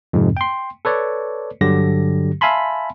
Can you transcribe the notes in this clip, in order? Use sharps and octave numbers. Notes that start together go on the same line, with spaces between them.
F2 G#2 C3
G5 C6
A4 B4 C#5 D5
G2 D3 F#3 G4 A#6
E5 F5 G#5 A5 B5 C6